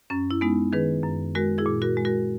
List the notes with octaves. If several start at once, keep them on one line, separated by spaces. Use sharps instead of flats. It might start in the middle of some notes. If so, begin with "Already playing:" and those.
F#2 C#4
E4
G#3 B3 D#4
D#3 G#4 B4
F#2
G#3 F#4 A#4
E4 G#4
A#2
F#4 A#4
G#3
F#4 A#4